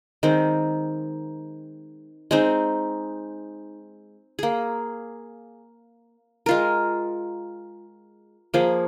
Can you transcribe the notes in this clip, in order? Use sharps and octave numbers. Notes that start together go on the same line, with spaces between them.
D#3 G#3 C4
G#3 C4 D#4
A#3 G#4
G#3 F4 A#4
F3 A#3 G#4